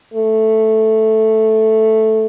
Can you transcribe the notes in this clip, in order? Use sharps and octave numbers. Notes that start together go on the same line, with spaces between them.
A3